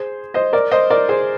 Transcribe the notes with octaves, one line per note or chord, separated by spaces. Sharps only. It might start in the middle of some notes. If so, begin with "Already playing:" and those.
Already playing: G#4 C5
C5 D#5
A#4 D5
C5 D#5
A#4 D5
G#4 C5